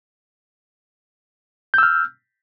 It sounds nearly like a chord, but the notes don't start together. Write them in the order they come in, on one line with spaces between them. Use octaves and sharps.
G6 E6 F6